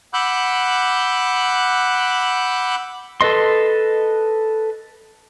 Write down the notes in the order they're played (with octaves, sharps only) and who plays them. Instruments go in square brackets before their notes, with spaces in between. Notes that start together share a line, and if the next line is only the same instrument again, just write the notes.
[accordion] F#5 B5 D6 E6 F#6 G6
[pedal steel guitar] A4 B4 D#5 C6